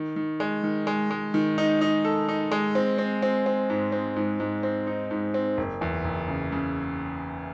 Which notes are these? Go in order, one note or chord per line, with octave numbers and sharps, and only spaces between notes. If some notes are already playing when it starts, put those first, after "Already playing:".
Already playing: D#3
D#3
G#3
D#3
G#3
G#3
D#3
D#4
D#4
A4
D#4
G#3
C4
C4
C4
C4
G#2
C4
G#2
G#2
C4
D#4
G#2
C4
F#1
E2
F#1
C#3
C#3